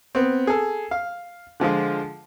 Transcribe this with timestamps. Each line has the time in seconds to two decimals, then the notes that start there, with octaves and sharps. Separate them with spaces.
0.15 B3 C4
0.47 G#4 A4
0.91 F5
1.60 D3 F3 G#3 F4